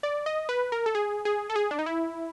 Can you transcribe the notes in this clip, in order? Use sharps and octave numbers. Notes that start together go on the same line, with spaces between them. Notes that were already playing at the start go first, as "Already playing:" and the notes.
D5
D#5
B4
A#4
A4
G#4
G#4
A4
G#4
D4
D#4
E4